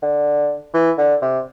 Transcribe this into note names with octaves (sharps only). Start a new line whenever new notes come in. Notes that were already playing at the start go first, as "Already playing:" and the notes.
D3
E3
D3
C3